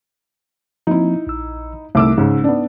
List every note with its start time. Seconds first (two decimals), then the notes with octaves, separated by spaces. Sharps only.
0.87 F3 A#3 C4 D#4 E4
1.27 A#1 E6
1.95 C2 A3 D#4 E5 D6 E6
2.18 G#2 C#3 D#4
2.44 B3 D4